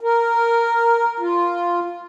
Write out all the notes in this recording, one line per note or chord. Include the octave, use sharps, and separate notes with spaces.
A#4
F4